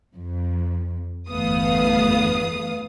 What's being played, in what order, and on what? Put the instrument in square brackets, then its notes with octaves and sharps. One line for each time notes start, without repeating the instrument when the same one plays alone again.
[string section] F2
G1 E2 A3 B3 F5 D#6